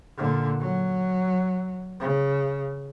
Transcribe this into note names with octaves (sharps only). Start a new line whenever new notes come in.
A#2 D3
F#3
C#3